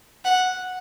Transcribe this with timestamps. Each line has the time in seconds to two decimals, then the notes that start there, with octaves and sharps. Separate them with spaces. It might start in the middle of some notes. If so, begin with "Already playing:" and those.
0.25 F#5